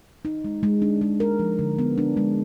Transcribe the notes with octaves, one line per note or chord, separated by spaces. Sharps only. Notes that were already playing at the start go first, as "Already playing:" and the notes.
D#4
G#3
G#3
D4
G#3
A#4
F3
D3
B3
D4
G#3